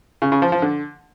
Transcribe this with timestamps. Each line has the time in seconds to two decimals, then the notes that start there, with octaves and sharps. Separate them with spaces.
0.22 C#3
0.32 C#3
0.42 F3
0.52 F3
0.62 D3